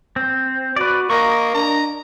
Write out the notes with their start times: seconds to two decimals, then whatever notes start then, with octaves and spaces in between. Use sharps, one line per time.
0.16 C4
0.76 F#4 B4 D5
1.10 A#3 A#4 D#5 C#6
1.54 D4 A#5